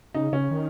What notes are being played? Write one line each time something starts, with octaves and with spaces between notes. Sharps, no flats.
C#3 D#4
C#3 C#4
D#3